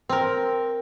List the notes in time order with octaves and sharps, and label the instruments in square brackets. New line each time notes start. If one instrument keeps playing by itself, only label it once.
[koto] C4 A#4